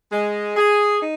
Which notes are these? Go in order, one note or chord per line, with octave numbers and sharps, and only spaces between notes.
G#3
G#4
D#4